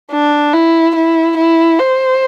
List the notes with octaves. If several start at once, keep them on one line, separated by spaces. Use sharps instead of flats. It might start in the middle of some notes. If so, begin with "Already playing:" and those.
D4
E4
E4
E4
C5